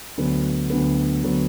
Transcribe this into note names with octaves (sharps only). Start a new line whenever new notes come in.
D2 D3 F#3 B3
D2 D3 F#3 B3
D2 D3 F#3 B3